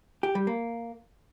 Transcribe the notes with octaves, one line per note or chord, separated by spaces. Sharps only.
G4
G3
A#3